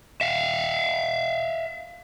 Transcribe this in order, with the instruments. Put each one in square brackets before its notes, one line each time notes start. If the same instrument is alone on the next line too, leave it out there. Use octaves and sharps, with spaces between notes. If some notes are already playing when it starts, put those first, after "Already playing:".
[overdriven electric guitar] E5 F5